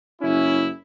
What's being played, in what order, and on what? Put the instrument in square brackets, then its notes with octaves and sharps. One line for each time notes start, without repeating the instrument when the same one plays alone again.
[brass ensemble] F#1 C#4 E4